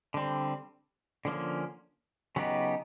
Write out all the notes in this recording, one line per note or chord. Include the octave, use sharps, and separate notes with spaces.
D3 G3 C4
D3 F3 A#3 C#4
C#3 F#3 B3 D#4 G4